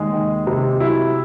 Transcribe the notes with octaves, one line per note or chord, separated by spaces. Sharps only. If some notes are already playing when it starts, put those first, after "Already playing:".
Already playing: D#2 G#3 G#4
D#3
C3
F#3 E4